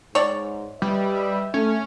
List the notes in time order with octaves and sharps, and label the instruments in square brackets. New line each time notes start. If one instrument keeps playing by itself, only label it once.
[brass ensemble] G#2 [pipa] C#5 D5
[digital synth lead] G3 [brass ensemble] B4 D#5 E5
[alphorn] A3 [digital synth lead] C#4